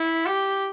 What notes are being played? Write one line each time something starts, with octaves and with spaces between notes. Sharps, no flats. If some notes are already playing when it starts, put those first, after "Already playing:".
Already playing: E4
G4